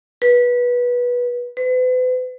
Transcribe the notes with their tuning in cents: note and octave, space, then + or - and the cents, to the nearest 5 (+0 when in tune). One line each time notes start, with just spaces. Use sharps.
B4 -20
B4 +40